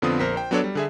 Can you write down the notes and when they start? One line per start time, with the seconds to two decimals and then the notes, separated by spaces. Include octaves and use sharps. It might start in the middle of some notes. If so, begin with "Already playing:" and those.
0.02 F2 D3 B3 C4 F4 D#6
0.19 A#1 A#4 C5 A#5 C6 B6
0.36 C5 G5
0.51 F#3 B3 D4 A4 C#5 D5
0.64 G3
0.75 D3 G#4 E5